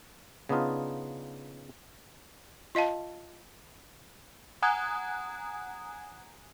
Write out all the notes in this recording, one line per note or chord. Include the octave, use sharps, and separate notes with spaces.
C#3 B3 D4 D#4 F4
F4 D#5 F5 A5
F#5 G#5 A#5 D#6 F#6 G#6